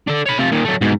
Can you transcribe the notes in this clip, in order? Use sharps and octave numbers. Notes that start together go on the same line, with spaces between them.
D4 A4
C#5 B5
C3 F4
A#2 D#3
F#3 A3
G#2 B2